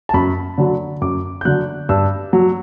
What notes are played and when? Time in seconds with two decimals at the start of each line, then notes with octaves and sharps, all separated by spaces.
0.09 A5
0.14 F#2 B5
0.58 D3 F#3
1.02 F#2 D6
1.41 G6
1.45 D3 F#3 F#6
1.89 G2 E6
2.33 F#3